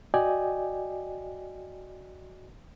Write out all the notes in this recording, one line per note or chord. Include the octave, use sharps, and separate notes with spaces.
F#4 D5 D#5 G5 G#5